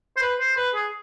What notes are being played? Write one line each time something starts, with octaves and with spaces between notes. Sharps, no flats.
C5
B4
C5
B4
G#4